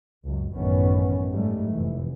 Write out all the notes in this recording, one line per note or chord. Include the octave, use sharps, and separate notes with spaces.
C#2 F#2
A1 F#2 A2 D#3 B3 C#4
G#2 G3 A3
F1 E3